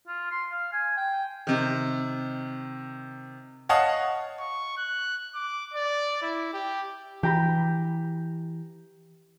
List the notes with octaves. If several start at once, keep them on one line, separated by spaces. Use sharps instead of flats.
F4
C6
F5
G#5
G5
C3 D#3
C#5 D#5 F5 F#5 A5
C#6
F#6
D6
D5
E4
G4
E3 G4 A#5 B5